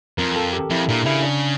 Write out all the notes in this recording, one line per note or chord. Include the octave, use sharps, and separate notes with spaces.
F2 A#4
A4
G4
F2 E4
A#2 D4
C#3 E4
D4